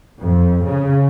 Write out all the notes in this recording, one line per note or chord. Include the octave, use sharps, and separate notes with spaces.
F2
C#3